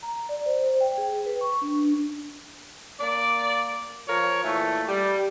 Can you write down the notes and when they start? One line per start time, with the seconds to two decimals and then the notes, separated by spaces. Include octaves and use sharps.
0.03 A#5
0.29 D5
0.46 C5
0.66 C5
0.81 G5
0.98 G#4
1.26 B4
1.41 C#6
1.62 D4
3.00 A#3 D5
4.07 F3 A#4 C#5
4.43 A#2 E3 A3
4.87 G3